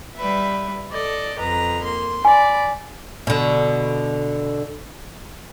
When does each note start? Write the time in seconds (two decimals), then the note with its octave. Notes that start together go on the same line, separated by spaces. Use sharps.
0.16 G3 B4 E5
0.92 A4 D5 D#5
1.39 F2 B4 A#5
1.83 A#3 C6
2.25 D5 G#5 B5
3.27 B2 D3